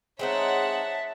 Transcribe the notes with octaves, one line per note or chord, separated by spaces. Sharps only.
G#3 C4 D#4 C#5 E5 F#5 A5